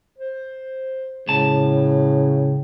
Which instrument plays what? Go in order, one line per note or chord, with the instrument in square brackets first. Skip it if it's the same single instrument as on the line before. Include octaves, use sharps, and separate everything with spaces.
[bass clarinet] C5
[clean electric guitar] C#2 A5 [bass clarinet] A2 [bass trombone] C#3